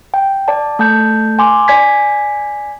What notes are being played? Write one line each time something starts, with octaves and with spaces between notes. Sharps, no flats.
G5
D5 A5
A3 A5 G6
G#5 C6 D6
D5 G#5 G#6 B6